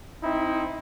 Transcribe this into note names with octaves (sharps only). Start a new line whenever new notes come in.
C4 D#4 E4